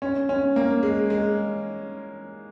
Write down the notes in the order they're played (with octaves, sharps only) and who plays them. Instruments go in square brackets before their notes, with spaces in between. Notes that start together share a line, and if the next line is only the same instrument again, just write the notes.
[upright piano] C#4
C#4
A#3
G#3
G#3